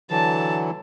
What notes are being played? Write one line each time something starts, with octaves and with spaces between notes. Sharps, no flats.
D3 E3 F#3 A5